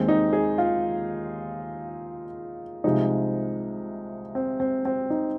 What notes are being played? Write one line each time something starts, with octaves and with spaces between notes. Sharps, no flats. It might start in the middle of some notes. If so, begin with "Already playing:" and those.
Already playing: D#2 D#3 G#3 C4
D#4
G#4
F4
C2 C3 F3 G#3 D#4
C4
C4
C4
D#4